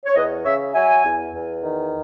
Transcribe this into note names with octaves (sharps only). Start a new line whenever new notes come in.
C#5
E2 B4 D#5
C#3 C#5 E5
F#3 E5 G#5
E2
E2
D#3